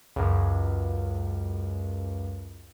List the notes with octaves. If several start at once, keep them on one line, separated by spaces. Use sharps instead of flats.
C#2 F#2